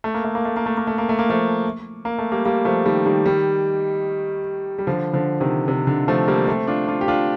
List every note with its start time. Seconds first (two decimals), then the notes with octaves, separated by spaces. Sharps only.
0.04 A3
0.14 A#3
0.25 A3
0.35 A#3
0.45 A3
0.56 A#3
0.66 A3
0.77 A#3
0.87 A3
0.98 A#3
1.09 A3
1.19 A#3
1.29 F3 A3
2.05 A#3
2.18 A3
2.32 G3 A#3
2.45 G3 A#3
2.65 F3 A3
2.86 D#3 G3
3.06 D#3 G3
3.26 D#3 G3
4.78 G3
4.87 D3 F3
5.13 D3 F3
5.40 C3 D#3
5.68 C3
5.87 D3
6.08 F3 A3
6.28 G3 A#3
6.48 A3 C4
6.67 D4 F4
6.88 D4 F4
7.01 G4
7.08 D4 F4